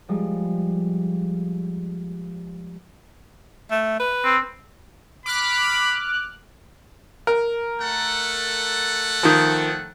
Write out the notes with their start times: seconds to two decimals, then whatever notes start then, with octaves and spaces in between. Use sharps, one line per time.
0.08 F3 G3 G#3
3.71 A3
3.99 B4
4.24 C4
5.26 B5 D6 F6 F#6
7.27 A#4
7.80 A3 A4 F#5
9.23 D#3 F3